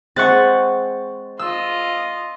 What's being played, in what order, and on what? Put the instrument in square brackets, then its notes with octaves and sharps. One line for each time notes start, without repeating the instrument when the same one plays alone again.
[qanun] G#3 C4 [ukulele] G#4 E5 F#5 [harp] C#6 F#6 A6
[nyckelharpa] F4 D#5 [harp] E6